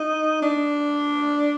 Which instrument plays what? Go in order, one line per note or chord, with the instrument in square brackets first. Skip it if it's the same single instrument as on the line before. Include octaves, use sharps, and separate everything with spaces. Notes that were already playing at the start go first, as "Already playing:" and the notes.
Already playing: [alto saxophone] D#4
D4